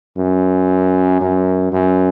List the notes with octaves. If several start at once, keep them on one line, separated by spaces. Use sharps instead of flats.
F#2
F#2
F#2